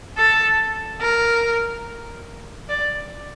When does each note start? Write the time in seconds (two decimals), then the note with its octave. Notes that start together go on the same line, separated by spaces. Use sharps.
0.17 A4
1.01 A#4
2.69 D5